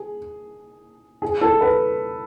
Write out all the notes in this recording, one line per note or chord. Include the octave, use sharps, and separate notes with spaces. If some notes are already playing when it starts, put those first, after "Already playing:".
Already playing: G#4
G#4
A4
B4